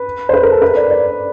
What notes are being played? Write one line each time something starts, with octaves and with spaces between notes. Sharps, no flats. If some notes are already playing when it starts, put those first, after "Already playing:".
Already playing: B4
C5
B4
A#4
A4
B4
D5
D5